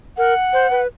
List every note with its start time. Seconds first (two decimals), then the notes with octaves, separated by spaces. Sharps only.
0.17 A#4 F#5
0.53 C5
0.71 B4